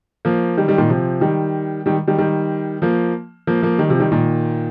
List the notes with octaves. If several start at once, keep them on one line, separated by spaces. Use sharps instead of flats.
F3 A#3
D#3 G3
D#3 G3
A#2 D#3
C3 F3
D#3 G3
D#3 G3
D#3 G3
D#3 G3
F3 A#3
F3 A#3
F3 A#3
D#3 G3
C3 F3
D#3 G3
A#2 D#3